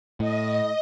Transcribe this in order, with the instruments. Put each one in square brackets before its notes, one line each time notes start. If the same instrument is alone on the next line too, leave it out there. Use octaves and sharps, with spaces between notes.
[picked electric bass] A2 [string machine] D#5